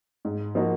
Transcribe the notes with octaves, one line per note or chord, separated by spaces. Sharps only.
G#2
F3 A#3 D#4 F#4